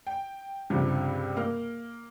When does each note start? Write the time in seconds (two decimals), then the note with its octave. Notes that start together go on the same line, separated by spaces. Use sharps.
0.07 G5
0.70 C#2 G2 C3 F3 G3
1.36 A#3 A#4 F6